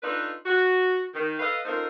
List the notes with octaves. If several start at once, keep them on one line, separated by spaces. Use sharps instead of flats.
D4 D#4 F4 A4 B4
F#4
D#3
A4 B4 D#5 F5
C#4 D#4 F4 A4 A#4 C5